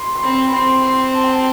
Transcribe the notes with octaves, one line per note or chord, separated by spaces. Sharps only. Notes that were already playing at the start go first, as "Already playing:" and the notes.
Already playing: B5 C6
C6
C4 B5
B5
C4 C6
C6
A5
G5
A5